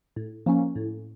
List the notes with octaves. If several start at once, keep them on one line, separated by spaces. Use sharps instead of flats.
A2
F3 A#3 C#4
A2